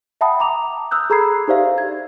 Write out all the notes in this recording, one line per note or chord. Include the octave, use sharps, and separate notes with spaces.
E5 F#5 G5 A5 B5 D#6
A#5 D6 F7
D#6 E6 F#6 G6
G#4 A4 A#5 B5 G#6 C7
D#4 G4 C5 D5 E5 F5
G#6